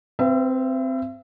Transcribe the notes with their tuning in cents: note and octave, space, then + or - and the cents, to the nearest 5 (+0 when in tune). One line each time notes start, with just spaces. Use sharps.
C4 -10 B4 +20 E5 +40